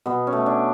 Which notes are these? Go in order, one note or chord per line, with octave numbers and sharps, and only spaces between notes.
B2 B3
C#4
A3
D4